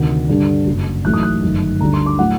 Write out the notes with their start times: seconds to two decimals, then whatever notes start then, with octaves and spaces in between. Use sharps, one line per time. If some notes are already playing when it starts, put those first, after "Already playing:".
Already playing: D2 C3 D#3
0.29 G2 D3 G3 D4
0.67 F#1 F#2 F#3
1.05 A1 A2 F#3 A3 D#4 F#6
1.14 D#6
1.23 F#6
1.43 G1 F#2 D#3 A3 D#4
1.81 D2 D3 G3 D4 A#5
1.94 C6
2.06 D6
2.19 A2 F#3 F#5